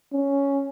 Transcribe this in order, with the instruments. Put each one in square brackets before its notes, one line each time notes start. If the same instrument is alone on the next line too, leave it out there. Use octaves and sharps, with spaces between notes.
[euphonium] C#4